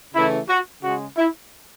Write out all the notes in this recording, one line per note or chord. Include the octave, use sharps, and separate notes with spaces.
C#3 E3 A3 E4
F#4
C#3 G#3 F#4
E4